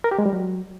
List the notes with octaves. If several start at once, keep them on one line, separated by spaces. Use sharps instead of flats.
A#4
G4
G#3
G3
F#3